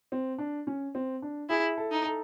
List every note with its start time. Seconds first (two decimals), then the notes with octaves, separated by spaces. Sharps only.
0.12 C4
0.38 D4
0.67 C#4
0.95 C4
1.22 D4
1.50 E4 G#4
1.77 A4
1.91 D#4
2.05 A4